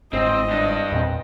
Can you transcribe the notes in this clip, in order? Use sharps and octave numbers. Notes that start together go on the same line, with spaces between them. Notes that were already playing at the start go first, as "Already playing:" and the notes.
G1 G#2 C4 D#5
G2 D4
E2 A#2 C4